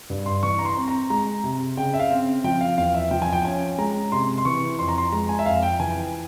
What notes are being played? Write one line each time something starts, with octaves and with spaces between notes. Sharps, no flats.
G2
C6
E3 C#6
A#5
C6
C4
A#5
G#3 A#5
C3
C#3 G5
E5
F5
C4
F3 G5
F5
E2 F5
E5
F3 G5
G#5
G5
C#4 G#5
G#3 A#5
C3 C6
C6
E3 C#6
F2 C6
A#5
C6
G#3 A#5
G#5
E5
F2 F5
G5
E3 G#5